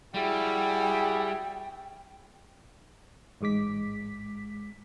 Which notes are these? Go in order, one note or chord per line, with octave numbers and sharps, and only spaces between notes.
G3 E4 F#4 G#4 G5
A1 G#2 G#3 D6 B6